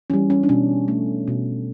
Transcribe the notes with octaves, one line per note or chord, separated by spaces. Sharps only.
E3 G3 C#4
C#4
D4
B2 C#4
A3
B2